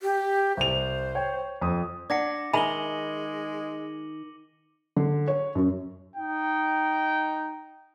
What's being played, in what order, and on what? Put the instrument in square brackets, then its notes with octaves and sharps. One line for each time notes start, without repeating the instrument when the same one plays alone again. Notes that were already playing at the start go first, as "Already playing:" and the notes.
[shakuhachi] G4
[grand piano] C2 F7 [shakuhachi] C5
[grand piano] C#5 G5
F2 D#6
[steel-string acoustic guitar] D4 [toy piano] D5 F#5 [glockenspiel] D6 A#6 C#7
[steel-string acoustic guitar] D#3 [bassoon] G#3 [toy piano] E5 G#5 B5 [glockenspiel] D#7 F#7 G7
[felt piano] D3
C#5
F#2
[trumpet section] D#4 G5